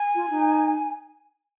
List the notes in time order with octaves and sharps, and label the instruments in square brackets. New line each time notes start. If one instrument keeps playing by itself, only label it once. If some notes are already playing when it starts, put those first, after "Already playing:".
Already playing: [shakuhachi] G#5
[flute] F4
D#4